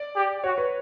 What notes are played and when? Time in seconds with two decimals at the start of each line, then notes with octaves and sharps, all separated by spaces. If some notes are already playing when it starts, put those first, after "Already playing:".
Already playing: D5
0.16 G4
0.44 F#4 C#5
0.58 B4